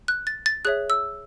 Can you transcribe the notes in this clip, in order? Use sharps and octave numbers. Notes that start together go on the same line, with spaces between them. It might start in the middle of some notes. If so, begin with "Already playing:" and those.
F#6
A6
A6
G#4 C#5 E5 F#6
E6